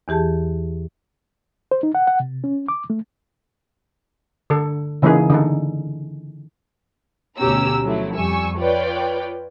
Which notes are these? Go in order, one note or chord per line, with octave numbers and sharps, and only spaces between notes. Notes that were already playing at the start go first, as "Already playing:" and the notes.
E2 E3 G4 G#4 A5
C5
D#4
F#5
F#5
C3
C#4
D6
A3
D3 A4
C#3 E3 A#3 D#4 E4 G#4
D3 D#4 A4
D2 B2 C#4 G4 A#5 E6
F3 F#3 A3 E4
F2 G3 G#5 C#6 E6
F4 B4 C#5 D5 G5